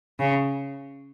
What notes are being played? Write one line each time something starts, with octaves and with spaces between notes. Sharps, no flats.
C#3